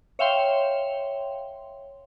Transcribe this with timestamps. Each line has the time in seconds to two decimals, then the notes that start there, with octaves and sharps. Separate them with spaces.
0.19 C#5 E5 F5 G5 C6